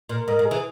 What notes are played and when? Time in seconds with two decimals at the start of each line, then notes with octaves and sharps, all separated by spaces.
0.09 A#2 A#4
0.28 G#2 A#4
0.39 G#2
0.45 G#4
0.51 E3